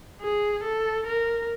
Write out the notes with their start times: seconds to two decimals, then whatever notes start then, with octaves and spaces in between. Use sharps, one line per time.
0.21 G#4
0.64 A4
1.07 A#4